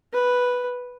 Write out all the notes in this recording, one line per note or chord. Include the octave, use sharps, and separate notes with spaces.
B4